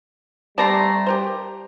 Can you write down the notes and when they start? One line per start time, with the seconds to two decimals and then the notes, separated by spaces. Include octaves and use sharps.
0.58 G3 A3 C4 D5 A5 A#5 C6
1.07 G4 A#4 C5